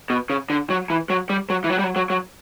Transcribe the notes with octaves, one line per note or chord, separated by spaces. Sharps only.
B2
C#3
D3
F#3
E3
F#3
G3
F#3
E3
F#3
G3
F#3
F#3
F#3